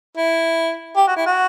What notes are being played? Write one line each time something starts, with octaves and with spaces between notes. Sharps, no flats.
E4
G4
F#4
E4
F#4